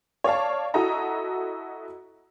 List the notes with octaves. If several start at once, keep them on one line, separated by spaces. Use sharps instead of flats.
C#5 D5 F5 A5
E4 F#4 A4 D#5 A#5